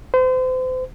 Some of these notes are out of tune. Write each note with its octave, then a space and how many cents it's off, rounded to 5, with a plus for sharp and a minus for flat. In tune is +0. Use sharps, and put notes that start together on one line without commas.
C5 -35